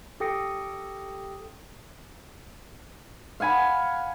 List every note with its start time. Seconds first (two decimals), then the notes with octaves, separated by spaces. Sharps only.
0.20 G4 A4 G5 D#6 A#6 C#7
3.40 F5 F#5 G#5 B5